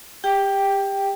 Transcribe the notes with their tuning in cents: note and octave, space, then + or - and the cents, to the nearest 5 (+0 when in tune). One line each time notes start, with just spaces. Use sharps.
G4 +25 G5 +0